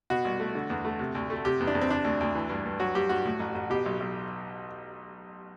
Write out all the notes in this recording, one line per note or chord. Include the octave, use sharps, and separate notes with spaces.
B2 F#4
C2
A3
D3
E2
A3
C3
D2
A3
C3 G4
E2
D4
E2
C4
C3 D4
D2
D2
E3
G2
G2
F#3 F#4
G2 G4
G2 F#4
A2
A1
A1
B2 G4
B1
B1